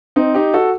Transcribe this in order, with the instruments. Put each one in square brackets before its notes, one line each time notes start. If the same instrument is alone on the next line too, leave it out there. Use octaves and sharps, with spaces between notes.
[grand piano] C4 D#4
D#4 G4
F#4 A4